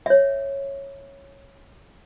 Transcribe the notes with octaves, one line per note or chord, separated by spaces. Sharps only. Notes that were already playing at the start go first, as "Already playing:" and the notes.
C#5 E5